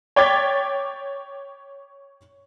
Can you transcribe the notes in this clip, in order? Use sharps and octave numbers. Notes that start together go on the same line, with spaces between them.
C#5 G5 D6 G#6 A6 B6